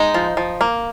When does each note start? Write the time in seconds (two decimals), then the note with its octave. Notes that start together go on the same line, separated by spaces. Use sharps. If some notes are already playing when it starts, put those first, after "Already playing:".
Already playing: G#3 D#4
0.14 F3
0.37 F3
0.61 A#3